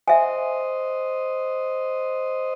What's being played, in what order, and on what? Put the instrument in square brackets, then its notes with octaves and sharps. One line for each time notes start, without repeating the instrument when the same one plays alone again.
[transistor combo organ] C5 D#5 [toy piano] E5 G#5